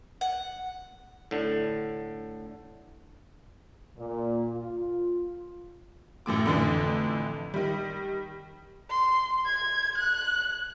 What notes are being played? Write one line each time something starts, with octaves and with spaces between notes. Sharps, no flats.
F#5
A2 D3
A#2
F4
A1 F#2 A2 D6
F2 A2 D3 E3 D4
D#3 G3
C6
G#6
F#6